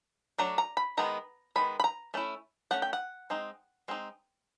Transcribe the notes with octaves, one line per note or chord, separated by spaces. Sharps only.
F#3 A3 D4 A#5
A#5
B5
D#3 G#3 B3 A#5
D#3 G#3 B3 B5
B5
A#5
A3 C#4 E4
A3 C#4 F#5
G5
F#5
G#3 C4 D#4
G#3 C4 D#4